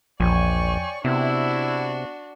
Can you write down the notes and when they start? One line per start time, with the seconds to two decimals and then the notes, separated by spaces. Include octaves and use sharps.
0.20 A#1 E2 F3 C#5 D5 G5 G#5 C#6
1.05 C3 B3 D4 E4 F#4